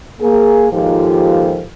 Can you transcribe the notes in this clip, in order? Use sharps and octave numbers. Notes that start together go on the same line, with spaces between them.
A#3 G#4
D#2 G#2 F3 F4 G4 A4